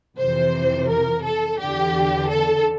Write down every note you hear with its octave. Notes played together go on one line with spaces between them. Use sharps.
F2 C3 E3 C5
A#4
A4
E2 D3 G4
A4